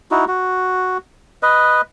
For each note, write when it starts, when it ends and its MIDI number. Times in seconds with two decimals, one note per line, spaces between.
0.11 0.25 63
0.11 0.25 64
0.11 0.25 66
0.28 0.98 66
1.43 1.81 71
1.43 1.81 75